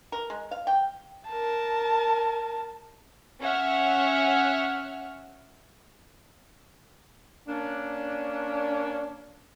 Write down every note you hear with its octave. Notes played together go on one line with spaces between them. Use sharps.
A#4
G#3
F5
G5
A#4 A5
C#4 C#5 E5 F#5 F6
A#3 C#4 D4